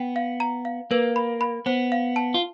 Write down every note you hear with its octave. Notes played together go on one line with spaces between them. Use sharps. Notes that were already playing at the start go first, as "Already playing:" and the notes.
Already playing: B3 G5
F5
A#5
F5
A#3 B4
B5
B5
B3 C5
F5
A5
F4